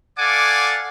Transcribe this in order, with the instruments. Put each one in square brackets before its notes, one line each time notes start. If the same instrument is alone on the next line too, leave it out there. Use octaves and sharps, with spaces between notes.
[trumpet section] A4 D5 F5 F#5 G#5 D6